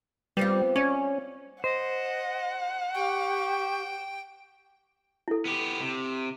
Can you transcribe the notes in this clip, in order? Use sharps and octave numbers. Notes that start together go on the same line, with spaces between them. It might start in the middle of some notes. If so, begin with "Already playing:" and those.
G3 B3 C4 F4
C#4 D5
C5 D#5 F#5
G4 G5 C#6
E4 A4
B3 G4
C3